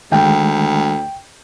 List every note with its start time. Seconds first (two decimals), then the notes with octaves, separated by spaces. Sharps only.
0.12 D2 D#3 G#3 G5